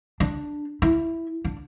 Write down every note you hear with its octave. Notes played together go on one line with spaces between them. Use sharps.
D4
E4
D4